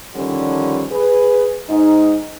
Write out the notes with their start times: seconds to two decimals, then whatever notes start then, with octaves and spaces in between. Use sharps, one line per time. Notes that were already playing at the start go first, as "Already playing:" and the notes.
0.15 D3 D#3 F3 G3 C#4
0.90 G#4 B4
1.70 G#2 D#4